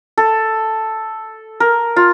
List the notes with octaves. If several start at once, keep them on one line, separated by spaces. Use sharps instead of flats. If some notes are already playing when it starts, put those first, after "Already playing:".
A4
A#4
F4